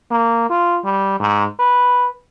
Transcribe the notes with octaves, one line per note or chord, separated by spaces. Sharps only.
A#3
F4
G3
G#2
B4